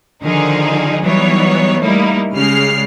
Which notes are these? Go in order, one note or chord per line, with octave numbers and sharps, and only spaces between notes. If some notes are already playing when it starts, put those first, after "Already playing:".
D3 D#3 F3 D#4 G#4
E3 F#3 G3 B3 D#4 C#5
G3 A3 A#3 D#4 E4
C#3 G3 G#3 F6 C7